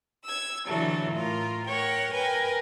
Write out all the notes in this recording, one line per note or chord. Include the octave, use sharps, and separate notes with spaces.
E6 G#6
D3 E3 F#3 A3 A4
A2 F4 A#4
A#4 C#5 F#5 G5
A#4 B4 G5 G#5